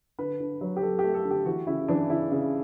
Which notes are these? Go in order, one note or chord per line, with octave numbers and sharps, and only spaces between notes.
D3 B4
D3
F#3
G4
F#3 A4
A3 G4
A4
D3
G4
E3 F#4
C#3 E4
E3 D4
C#3 E4
C#3